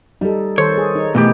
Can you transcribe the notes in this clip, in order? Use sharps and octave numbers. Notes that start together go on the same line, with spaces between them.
G3 D#4 A4
D#3 A4 C5 C#5
G#4
D#4
B2 E3 A3 G4